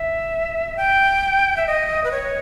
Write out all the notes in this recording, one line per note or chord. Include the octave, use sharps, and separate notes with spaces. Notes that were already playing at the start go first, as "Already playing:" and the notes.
Already playing: E5
G5
E5
D#5
B4
C#5